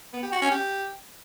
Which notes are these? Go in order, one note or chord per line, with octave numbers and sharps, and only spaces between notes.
B3
G4
F#4
C#4
G4